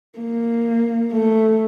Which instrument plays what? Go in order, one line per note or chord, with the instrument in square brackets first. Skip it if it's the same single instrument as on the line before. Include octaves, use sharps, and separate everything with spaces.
[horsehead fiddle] A#3
A3